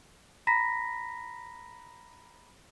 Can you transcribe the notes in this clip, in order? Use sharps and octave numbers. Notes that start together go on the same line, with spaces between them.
A#5 B5 A#6 B6